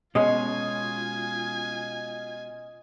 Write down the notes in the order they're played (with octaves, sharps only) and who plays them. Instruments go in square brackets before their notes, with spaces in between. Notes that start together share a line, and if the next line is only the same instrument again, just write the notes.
[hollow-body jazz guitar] B2 G#3 C#4 [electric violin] F4 G#5 [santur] D#5 C6